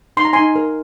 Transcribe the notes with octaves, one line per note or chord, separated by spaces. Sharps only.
D#4 C6
A#5
D#4 G#5 C6
A#4